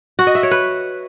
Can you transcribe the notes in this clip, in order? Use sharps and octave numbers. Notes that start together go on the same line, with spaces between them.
F#4
D#5
E5
C#5
B4